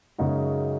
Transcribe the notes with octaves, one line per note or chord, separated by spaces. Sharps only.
F#2 C#3 G#3 D#4 F#4